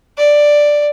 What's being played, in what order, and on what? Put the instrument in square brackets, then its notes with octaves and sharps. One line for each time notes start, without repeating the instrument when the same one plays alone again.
[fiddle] D5